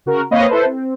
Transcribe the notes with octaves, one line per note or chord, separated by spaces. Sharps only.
C#3 F#4 A#4
A#3 C4 B4 C#5 D#5 F5
E4 A4 B4 C5
C4